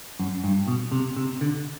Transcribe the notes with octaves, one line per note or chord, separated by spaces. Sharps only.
F#2
G2
B2
C3
C3
D3